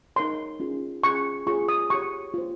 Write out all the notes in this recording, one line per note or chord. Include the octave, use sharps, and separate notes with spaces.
D#4 A#4 C#5 C6
C#4 F4 G#4
C#4 F4 G#4 C#6
F4 G#4 C#5 C#6
D#6
G4 C#5 C#6
F4 C5